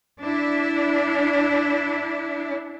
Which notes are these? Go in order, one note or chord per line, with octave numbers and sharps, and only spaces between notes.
D4 E4